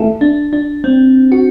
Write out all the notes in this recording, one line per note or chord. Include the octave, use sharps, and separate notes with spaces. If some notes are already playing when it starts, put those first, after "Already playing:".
Already playing: E3 A3
D4
D4
C4
F#4